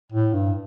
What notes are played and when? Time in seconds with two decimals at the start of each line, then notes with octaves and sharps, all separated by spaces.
0.12 A2
0.34 G2